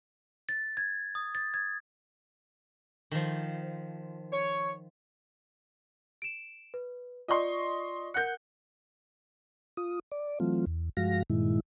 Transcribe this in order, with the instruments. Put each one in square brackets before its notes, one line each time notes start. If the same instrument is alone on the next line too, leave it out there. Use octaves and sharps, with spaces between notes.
[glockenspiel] A6
G#6
D#6
A6
G#6
[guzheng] D#3 F3
[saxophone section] C#5
[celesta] D7 E7
B4
[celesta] F4 D5 [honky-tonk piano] D#5 C6 C#6
[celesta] A#4 F#5 C#7 [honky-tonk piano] F#6 G6
[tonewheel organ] F4 D#6
D5
E3 F#3 A3 C4 F4
E2
G2 F3 G#3 F#4 F5 A#6
G2 A#2 D#3 G#3 E4